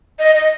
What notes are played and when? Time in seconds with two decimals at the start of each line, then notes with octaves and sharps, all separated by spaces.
0.19 D#5
0.35 D#5